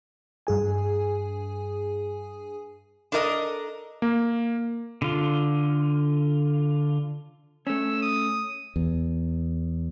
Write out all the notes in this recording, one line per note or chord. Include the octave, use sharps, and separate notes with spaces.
G2 G#4 G#5
D4 A4 A#4 D#5
A#3
D3 F4
A3 C#4 E6
D#6
E2